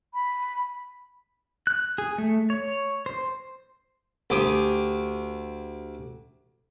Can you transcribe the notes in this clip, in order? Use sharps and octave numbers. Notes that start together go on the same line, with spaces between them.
B5
F#6
G#4
A3
C#5
C5
D2 G4 G#5 D#6